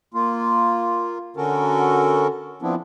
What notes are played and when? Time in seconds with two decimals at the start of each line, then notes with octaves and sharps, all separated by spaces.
0.14 A#3 F4
1.36 D3 C#4 F#4 A4 A#4
2.62 F3 B3 C4 D4 E4